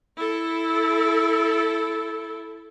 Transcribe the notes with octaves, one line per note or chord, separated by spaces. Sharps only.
E4 A4